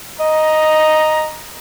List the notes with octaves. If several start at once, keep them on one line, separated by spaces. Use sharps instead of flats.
D#5 A#5